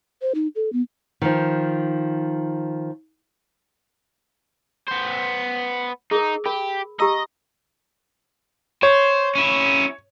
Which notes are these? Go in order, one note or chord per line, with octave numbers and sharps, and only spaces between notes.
C5
D#4
A4
B3
D#3 F3
B3 C5
D#4 G#4 A#4
G4 A#4 B5
G4 D#5 A#5 E6
C5 C#5
C#4 E4